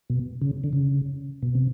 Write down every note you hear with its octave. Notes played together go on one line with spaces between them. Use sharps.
B2
C#3
D3
C#3
B2
C3